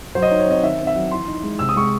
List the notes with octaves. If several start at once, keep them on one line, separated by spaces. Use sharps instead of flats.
F#3 C5
D#5
C#5
D#4
C#5
C4 D#5
D#3 E5
C4
E5
F#3
E3 C6
D#4
G#3
C3 E6
D#6
G#3 C#6